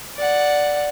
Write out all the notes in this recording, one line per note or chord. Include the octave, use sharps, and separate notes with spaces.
D5 F#5